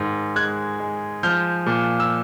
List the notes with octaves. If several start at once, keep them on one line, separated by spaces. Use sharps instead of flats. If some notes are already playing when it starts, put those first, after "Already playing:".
Already playing: G#2 D#3
G#3 F#6 G#6
G#3
F3 F6 G6
A#2
E6